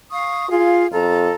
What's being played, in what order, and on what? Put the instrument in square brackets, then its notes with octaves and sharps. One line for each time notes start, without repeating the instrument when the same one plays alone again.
[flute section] F5 C#6 D#6
[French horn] F4 [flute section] G#4 F5
[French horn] F2 [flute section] F4 A4 A#5